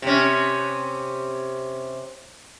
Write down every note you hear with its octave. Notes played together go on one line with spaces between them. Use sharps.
C3 C#4